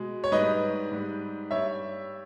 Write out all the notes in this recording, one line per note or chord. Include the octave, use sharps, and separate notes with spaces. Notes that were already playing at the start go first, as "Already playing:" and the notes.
Already playing: B2 G#3
C#5
G#2 G3 B4 D#5
G#2 G3
G2 G3 C#5 E5